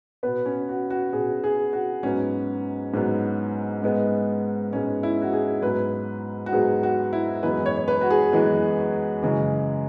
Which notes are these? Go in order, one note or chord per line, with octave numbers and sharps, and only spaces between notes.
B2 B3 B4
C#4
F#4
F#4
B2 B3 G#4
G#4
F#4
G#2 F#3 B3 C#4
G#2 F#3 B3
G#2 G#3 B3
G#2 G#3 B3 C#4
E4
F#4
G#4
G#2 F#3 B3 B4
F#4
G#2 F#3 B3 G#4
F#4
E4
F#2 E3 G#3 B3 B4
C#5
C#5
B4
F#4
G#4
F#2 E3 G#3 B3
F#2 C#3 E3 G#3